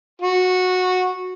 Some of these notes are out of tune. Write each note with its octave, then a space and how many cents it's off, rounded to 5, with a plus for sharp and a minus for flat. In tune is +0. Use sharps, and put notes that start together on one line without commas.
F#4 -15